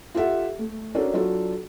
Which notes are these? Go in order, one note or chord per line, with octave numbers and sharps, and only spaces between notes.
F4 G4 A4 E5 F#5
A3
C#4 D4 F#4 A4 A#4
F#3 D4 F4 F#4 A4